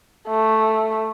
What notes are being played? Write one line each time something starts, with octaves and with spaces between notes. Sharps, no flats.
A3